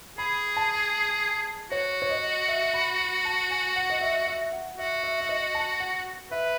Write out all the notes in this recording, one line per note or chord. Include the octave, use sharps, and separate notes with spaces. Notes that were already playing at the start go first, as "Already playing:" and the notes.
G#4 B5
A5
F#4 C#5
C#5
D#5
E5
B5
B5
A5
G#5
F#5
D#5
E5
E5
F#5
F#4 E5
E5
E5
D#5
A5
F#5
B4 E5